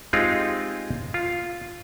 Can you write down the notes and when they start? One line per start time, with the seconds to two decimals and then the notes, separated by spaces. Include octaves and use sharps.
0.13 G#3 C4 D#4 F4 G4 G#4
1.14 F4